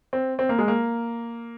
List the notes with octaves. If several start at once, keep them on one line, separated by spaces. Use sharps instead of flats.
C4
C4
A#3
G#3
A#3